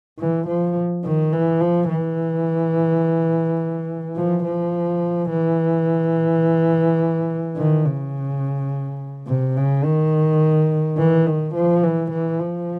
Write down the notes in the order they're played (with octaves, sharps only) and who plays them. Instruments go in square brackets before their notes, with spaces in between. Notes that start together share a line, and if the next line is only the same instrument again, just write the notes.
[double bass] E3
F3
D#3
E3
F3
E3
F3
F3
E3
D#3
C#3
C3
C#3
D#3
E3
D#3
F3
E3
E3
F3